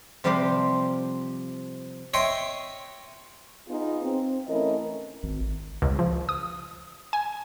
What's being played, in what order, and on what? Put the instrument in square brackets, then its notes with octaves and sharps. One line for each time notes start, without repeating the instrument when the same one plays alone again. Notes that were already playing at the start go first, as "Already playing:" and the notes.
[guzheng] C3 F3 G3 F4 G4 C5
[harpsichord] C#5 D#5 E5 G5 C6
[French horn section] B3 D#4 F4 G#4
C4
E3 A3 C#4 E4 A#4 D#5
[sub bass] G#1
[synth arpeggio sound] C#2
F3
D#6
G#5